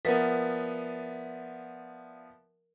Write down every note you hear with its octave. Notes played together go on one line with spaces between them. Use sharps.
F3 B3 A#4 B4 D5 E5 F#5